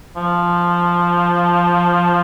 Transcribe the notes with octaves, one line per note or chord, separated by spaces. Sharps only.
F3